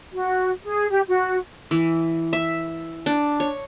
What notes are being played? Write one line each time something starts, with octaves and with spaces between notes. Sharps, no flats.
F#4
G#4
G4
F#4
E3
E5
D4
C#5